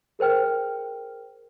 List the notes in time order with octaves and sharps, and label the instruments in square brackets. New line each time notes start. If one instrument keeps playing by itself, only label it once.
[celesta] G#4 A#4 C5 G5 F6